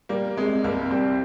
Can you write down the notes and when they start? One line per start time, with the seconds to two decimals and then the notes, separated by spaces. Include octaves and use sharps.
0.09 G3 A#3
0.37 C3 G#3
0.64 C2 A#3
0.91 G3 C4